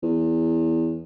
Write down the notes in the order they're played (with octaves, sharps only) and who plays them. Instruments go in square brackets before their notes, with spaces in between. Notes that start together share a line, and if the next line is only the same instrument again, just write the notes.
[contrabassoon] E2